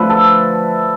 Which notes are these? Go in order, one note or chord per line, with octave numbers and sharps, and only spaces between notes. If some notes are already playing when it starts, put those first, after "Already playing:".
Already playing: D3 F3 A3 B4 E5
A4